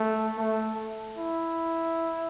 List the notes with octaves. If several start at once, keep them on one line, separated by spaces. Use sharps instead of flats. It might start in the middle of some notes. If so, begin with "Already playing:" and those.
Already playing: A3
A3
E4